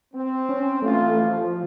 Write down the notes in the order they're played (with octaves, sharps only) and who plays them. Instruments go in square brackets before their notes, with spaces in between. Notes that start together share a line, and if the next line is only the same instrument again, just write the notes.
[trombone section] C4
[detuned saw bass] C#4
[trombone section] A1 F4 [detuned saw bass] A3
[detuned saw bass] F3